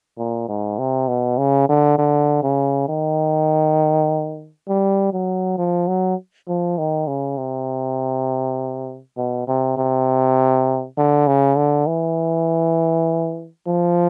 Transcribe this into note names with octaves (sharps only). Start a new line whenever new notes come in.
A#2
G#2
C3
B2
C#3
D3
D3
C#3
D#3
G3
F#3
F3
F#3
F3
D#3
C#3
C3
B2
C3
C3
D3
C#3
D3
E3
F3